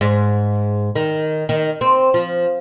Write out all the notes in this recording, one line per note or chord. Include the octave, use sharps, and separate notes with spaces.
G#2
D#3
D#3
C4
F3